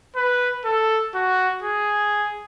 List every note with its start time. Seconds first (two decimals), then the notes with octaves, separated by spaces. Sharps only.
0.16 B4
0.65 A4
1.15 F#4
1.63 G#4